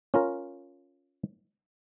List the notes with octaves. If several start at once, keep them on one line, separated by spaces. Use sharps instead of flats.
C#4 F4 A#4